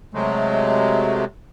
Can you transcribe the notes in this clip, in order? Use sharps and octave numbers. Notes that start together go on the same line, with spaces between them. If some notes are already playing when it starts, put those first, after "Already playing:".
C3 F#3 G#3 A3